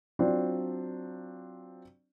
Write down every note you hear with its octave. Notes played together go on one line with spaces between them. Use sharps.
F#3 C4 D4 F4